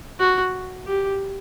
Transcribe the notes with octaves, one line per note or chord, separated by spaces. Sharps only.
F#4
G4